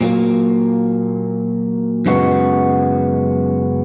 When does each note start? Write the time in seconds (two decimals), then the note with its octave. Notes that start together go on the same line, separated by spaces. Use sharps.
0.01 A#2 F#3 A#3
2.06 F#2 C#3 G#3 B3 F#4